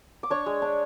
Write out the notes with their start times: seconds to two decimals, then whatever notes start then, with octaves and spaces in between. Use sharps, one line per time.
0.23 D6
0.30 D4 C#5 C#6
0.46 G#3
0.62 D4